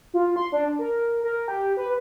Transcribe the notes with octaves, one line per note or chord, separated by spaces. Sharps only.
F4
C6
D4
A#4
A#4
G4
B4